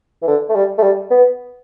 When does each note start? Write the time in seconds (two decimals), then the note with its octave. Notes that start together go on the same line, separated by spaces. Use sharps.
0.22 E3
0.27 D3
0.49 A3
0.55 G3
0.78 A3
0.83 G3
1.10 B3